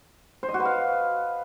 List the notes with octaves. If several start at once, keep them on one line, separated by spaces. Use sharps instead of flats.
C5
D#5
F#4
B4
F5